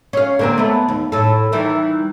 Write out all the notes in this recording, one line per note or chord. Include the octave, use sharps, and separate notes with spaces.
C#4 F5
D3 A#3 C4
A3 B3
D#2
A2 A4
D#3 E3 G3